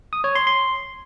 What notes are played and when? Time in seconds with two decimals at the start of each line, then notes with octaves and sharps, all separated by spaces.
0.13 D#6
0.24 C#5
0.35 C6
0.47 C6